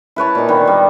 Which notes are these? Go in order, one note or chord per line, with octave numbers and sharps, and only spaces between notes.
E4 B4 C#5 A5
A#2 D#4
D3 D#3 B3
G3 D#5